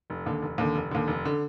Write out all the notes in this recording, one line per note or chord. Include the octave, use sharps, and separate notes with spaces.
F1
D#2 D3
F1
D#2 D3
F1
D#2 D3
F1
D3